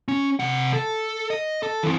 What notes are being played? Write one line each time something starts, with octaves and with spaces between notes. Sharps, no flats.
C#4
C3 F#5
A4
D#5
A4
E3 C4